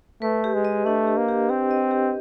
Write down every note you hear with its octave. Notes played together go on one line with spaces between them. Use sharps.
A3 B4
G4
G#3
D#5
A3 D4
G4
A#3
G4
C4 G4
D#5
G4